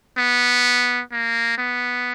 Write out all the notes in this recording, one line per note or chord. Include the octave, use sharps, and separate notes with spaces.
B3
A#3
B3